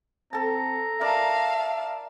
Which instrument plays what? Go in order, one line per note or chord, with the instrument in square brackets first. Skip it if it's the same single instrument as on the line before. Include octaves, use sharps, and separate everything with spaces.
[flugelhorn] C4 [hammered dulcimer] A4 A5 [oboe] A#5
[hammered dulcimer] A#4 D5 D6 [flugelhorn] E5 [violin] F5 A5